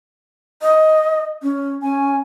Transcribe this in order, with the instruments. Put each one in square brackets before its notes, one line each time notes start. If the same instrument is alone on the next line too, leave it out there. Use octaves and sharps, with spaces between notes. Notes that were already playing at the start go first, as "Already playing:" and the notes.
[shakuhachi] D#5
C#4
[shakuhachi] C#4 [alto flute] G#5